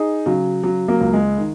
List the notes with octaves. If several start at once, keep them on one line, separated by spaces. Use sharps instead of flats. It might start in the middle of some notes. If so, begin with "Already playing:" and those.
Already playing: D#4 G#4
C#3 F#3
C#3 F#3
F#3 A#3
C#2
G#3
D#3